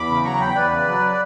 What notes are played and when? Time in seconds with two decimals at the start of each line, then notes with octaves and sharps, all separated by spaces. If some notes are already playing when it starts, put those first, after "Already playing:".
Already playing: E2 B5 D6
0.10 C#3
0.24 F#3 A#5 C#6
0.40 E2 G5 B5
0.55 E2 B4 D5
0.71 C#3
0.88 F#3